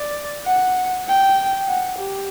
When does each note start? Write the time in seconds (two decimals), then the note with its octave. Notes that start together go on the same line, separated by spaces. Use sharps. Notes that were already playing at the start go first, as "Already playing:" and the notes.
Already playing: D5
0.46 F#5
1.08 G5
1.68 F#5
1.99 G4